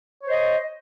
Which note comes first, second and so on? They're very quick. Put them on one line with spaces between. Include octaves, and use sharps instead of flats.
C#5 C5 D#5